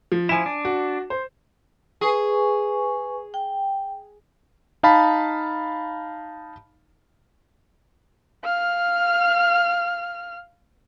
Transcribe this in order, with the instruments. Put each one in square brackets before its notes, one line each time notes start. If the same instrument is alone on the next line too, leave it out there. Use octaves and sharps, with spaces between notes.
[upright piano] F3
[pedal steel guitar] F3 E4 [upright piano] G#5 E7
[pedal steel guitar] D4
[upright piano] F#4
C5
[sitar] G#4 [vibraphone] B4 G#5 C#6
[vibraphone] G5
[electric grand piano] D#4 F5 A5 B5
[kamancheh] F5 F6